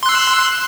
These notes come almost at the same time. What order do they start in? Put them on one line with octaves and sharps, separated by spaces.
C6 F#6 E6